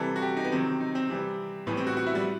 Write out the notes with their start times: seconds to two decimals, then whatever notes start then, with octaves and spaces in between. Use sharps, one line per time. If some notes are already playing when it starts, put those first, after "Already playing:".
Already playing: C3 E3 G3 A4
0.16 F#4
0.22 G4
0.37 D#4
0.44 B3
0.52 C3 D#3 F#3 C4
0.80 D#4
0.95 C4
1.10 C3 E3 G3
1.67 A2 E3 G3 B3
1.77 C4
1.87 F#4
1.97 F#4
2.06 E4
2.15 G3